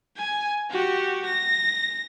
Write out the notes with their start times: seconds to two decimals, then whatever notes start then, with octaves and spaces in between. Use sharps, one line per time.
0.16 G#5
0.70 F#4 G4
1.25 A#6